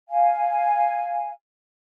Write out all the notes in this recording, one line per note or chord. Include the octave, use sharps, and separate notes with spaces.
F5 G#5